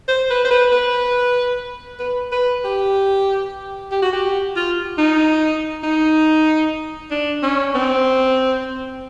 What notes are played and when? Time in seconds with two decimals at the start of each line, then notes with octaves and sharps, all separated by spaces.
0.08 C5
0.30 B4
0.44 C5
0.51 B4
0.72 B4
2.00 B4
2.32 B4
2.65 G4
3.91 G4
4.02 F#4
4.13 G4
4.56 F4
4.98 D#4
5.83 D#4
7.11 D4
7.43 C#4
7.74 C4